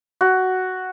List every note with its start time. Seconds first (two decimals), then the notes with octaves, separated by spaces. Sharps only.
0.21 F#4